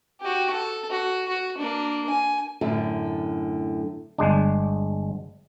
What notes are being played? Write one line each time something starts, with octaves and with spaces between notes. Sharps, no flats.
F#4 G4
A4
F#4
F#4
A#3 D4
G#5
F#2 A2 D3
G1 G#3 D4